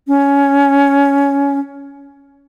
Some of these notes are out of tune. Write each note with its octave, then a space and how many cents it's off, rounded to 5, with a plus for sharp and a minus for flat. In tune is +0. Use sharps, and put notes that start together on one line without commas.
C#4 +15